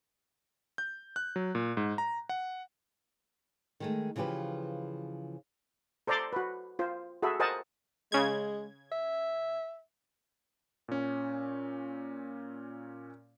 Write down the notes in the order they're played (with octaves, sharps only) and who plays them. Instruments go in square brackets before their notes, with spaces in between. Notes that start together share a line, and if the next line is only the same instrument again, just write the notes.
[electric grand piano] G6
F#6
F#3
A#2
G#2
A#5
F#5
[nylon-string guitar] D#3 G#3 A3
C#3 E3 F3 G4 B4
[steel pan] A4 C5 D5 A#5 C6 D6
F#4 B4
F4 C5
F#4 G#4 A4 E5 B5
A#4 C5 D#5 F#5 G#5 A5
[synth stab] C#3 G#6 [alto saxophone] G#3
[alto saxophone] E5
[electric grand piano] A#2 C#4